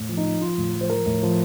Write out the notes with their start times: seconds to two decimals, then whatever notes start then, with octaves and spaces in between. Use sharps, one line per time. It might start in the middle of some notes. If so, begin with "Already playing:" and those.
Already playing: A2
0.09 F3
0.17 D#4
0.26 F3
0.41 F3 F4
0.58 A2
0.74 F3
0.81 C5
0.89 F3 A#4
1.06 A2
1.23 F3